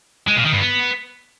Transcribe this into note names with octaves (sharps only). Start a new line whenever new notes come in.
G#3
A#2
D#3
G2
B3